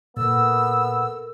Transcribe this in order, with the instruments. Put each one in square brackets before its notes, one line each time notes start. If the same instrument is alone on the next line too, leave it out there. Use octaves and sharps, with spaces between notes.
[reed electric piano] A#2 [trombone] B3 [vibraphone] A4 A#4 [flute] E6